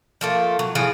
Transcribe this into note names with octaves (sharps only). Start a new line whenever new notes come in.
F3 A3 A#3
F#3
E3 F3 G#4